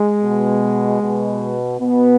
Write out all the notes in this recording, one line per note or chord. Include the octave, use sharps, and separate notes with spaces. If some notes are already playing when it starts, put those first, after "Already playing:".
Already playing: G#3
B2
B2
B2 B3